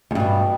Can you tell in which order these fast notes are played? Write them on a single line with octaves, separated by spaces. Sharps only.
E2 G2 B2